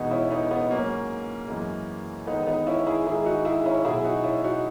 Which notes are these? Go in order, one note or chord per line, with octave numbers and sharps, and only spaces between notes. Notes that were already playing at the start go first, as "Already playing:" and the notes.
Already playing: E2 B2 G#3 B3 D#4
C#4 E4
B3 D#4
B3 D#4
G#2 F#3 A#3 C#4
F#2 E3 G#3
E2 D#3 G#3 B3 D#4
B3 D#4
C#4 E4
E4 G#4
G#2 D#3 G#3 E4 G#4
D#4 F#4
E4 G#4
C#4 E4
B2 F#3 E4 G#4
D#4 F#4
C#4 E4
D#4 F#4